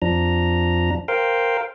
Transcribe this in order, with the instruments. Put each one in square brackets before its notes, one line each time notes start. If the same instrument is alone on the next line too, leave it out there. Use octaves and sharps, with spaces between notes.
[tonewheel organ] F2 F3 D4 A#5
A#4 C5 F5 G5